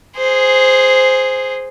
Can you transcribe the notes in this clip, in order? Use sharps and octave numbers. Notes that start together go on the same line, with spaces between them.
G#4 C5